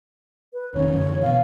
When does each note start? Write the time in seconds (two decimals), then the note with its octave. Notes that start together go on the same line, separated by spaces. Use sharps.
0.53 B4
0.74 F1 D#3 C#4 C#5
0.92 F#2 D3 E3
1.22 B2 B3 F5